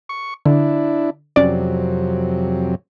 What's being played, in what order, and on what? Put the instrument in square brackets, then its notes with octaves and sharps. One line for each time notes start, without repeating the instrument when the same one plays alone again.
[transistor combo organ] C#6
[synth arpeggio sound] D3 [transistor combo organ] D4 E4
[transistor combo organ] F2 C3 F#3 [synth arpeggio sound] C#4 D5